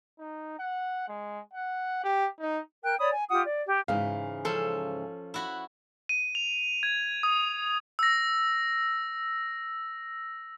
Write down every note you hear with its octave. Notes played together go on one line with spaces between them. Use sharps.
D#4
F#5
G#3
F#5
G4
D#4
A#4 G5 F#6
C#5 D5 B5 D#6
G#5
F4 G4 F#5 D#6
D5
G4
G#2 C#3 E3 F5
F3 C#4 A4 C6
E4 F#4 B5
D#7
F7
G#6
D#6
E6 A#6